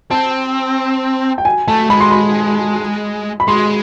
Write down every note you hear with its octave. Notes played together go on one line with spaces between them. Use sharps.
C4 A5
G5
G#5
A3 A5
G#3 B5
C6
B5
B5
G#3 C6